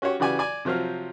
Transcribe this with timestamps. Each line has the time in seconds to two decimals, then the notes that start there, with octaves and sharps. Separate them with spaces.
0.02 C#4 F#4 G4 C#5
0.20 C#3 E3 F#4 G4 D5 G#5
0.39 D5 G#5
0.65 C3 F3 F#3 C5 F6